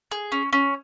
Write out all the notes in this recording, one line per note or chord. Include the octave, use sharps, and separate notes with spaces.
G#4
C#4
C#4